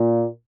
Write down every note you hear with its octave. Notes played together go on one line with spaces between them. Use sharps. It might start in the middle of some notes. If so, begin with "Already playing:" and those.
Already playing: A#2